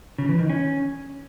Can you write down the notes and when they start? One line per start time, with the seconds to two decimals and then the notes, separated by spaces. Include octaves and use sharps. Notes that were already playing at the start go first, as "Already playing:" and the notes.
0.18 C#3
0.29 E3
0.39 D#3
0.50 C#4